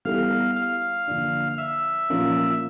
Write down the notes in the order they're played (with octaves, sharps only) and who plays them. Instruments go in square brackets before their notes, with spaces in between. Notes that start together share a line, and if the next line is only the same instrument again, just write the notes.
[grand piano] G3 B3 E4 A4 [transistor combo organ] F5
[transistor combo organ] F5
[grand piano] D3 F3 A#3 D4
[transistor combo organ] E5
[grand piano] A#2 F3 A#3 C#4 F4